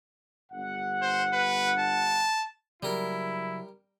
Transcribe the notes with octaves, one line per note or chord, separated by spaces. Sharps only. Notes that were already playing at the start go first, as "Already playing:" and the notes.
G1 F#5
C5
B4
A5
C#3 F#3 G3 E4 A#4